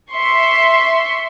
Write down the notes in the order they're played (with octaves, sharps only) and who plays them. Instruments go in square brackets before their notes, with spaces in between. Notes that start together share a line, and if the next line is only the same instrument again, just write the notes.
[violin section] E5 C6 C#6